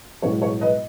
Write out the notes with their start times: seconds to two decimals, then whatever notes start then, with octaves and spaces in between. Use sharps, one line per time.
0.22 B1 A2 G#3 B3 C#5
0.42 C#5
0.61 B4 D#5